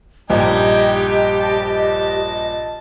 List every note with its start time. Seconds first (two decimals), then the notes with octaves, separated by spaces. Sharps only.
0.30 A#1 G2 D#4 G4 D#5 G5 G#5
1.41 A5